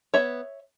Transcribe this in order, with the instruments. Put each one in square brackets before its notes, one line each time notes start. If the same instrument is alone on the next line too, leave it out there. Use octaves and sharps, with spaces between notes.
[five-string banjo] B3 C#5 E5